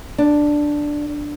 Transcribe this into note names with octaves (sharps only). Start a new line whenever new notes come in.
D4